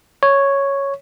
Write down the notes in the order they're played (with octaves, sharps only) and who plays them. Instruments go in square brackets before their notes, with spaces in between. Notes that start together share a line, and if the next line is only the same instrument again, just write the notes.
[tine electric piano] C#5